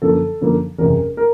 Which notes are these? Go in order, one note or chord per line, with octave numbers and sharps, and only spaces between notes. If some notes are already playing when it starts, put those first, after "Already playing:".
F#2 D3 F3 A#3 A4
F#2 D3 F3 A#3
F#1 E2 C3 A#4
A#4